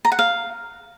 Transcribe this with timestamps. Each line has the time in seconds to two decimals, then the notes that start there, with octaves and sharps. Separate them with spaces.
0.05 A#5
0.12 F#5
0.19 F5